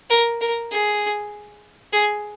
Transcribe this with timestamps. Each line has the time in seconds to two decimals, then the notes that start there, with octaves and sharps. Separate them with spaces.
0.10 A#4
0.41 A#4
0.71 G#4
1.93 G#4